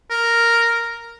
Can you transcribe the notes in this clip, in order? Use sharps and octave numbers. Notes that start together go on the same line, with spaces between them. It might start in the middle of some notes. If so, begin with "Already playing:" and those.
A#4